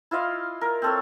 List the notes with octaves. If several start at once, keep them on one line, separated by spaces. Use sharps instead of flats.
E4 F4 D#5 F5
A#4
C4 A4 C#5